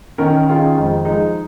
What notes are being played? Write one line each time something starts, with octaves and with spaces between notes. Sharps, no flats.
D#3 C#4 A#4
D#3 C#4 F4 G#4
F2 D#3 G#3 D#4
F3 G#3 D#4